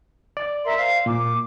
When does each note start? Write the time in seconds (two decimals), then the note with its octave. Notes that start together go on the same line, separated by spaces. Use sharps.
0.37 D5
0.65 A#4 E5 C6
0.78 C5 F5
1.06 A#2 D6